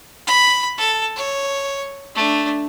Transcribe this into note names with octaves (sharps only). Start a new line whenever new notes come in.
B5
A4
C#5
A3 D4